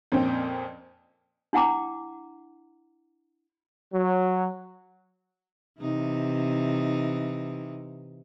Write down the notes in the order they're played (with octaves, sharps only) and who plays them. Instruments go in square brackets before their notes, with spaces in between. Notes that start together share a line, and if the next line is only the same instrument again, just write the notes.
[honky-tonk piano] F2 A#2 C4 C#4 C5 G5
[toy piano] D4 E4 F#5 G5 A#5 D6
[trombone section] F#3
[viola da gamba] C3 E3 D#4